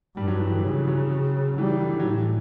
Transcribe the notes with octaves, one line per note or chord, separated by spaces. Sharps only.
G2 G3
F#3
E3
D3
C#3 E3
F#3
E3 G3
E3
D3
D3
F#3
A2 E3